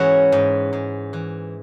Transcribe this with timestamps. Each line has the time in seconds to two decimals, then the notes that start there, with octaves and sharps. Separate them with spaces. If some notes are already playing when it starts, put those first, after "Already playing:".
Already playing: G#2 E3 C#4 E4 F#4 G#4
0.32 G#2
0.73 G#2
1.13 E3